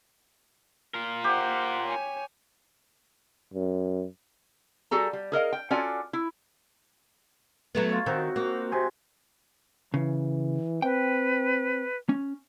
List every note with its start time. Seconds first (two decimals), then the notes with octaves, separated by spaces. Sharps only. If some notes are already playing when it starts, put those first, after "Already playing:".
0.94 F4 A#4
1.24 G4 C5 F#5
1.85 C#5 G#5
3.54 F#2
4.91 G3 F#4 G#4 A4 A#5
5.13 G3
5.32 G#4 A#4 D#5 F5
5.52 G5
5.71 C#4 F4 F#4 A4 D5 G#5
6.13 E4
7.75 F#3 A3 B3
7.90 F4 C#5
8.06 D#3 C4 D#4 F#4
8.36 A#3 F#4
8.72 C3 G#5 C6
9.94 C#3 E3
10.82 C4 B4 G5
12.09 C#4